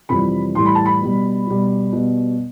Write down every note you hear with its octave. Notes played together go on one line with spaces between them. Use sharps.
F2 C3 E3 G3 B5
A2 E3 G3 C6
B5
A5
B5
B2 G3
B2 G3
B2 G3